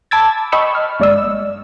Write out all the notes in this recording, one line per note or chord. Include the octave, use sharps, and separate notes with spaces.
A5 B5 D6 E6 G#6 A6
D#5 G5 B5 C#6 E6
F6
G1 G#3 D5 D#5 E6